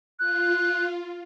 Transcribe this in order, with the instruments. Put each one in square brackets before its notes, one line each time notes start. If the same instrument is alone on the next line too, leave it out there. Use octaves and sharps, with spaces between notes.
[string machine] F4 [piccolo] F#6